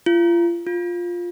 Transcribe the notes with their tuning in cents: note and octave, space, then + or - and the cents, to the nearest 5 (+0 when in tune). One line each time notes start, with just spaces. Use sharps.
F4 -35
F4 +5